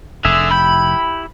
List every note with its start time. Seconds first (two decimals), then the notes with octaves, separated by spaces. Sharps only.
0.25 F1 D3 G#4 E5
0.51 E4 G4 G5 B5